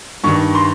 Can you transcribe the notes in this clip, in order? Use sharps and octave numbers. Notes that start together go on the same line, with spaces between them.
G2 D#3 C#6
C6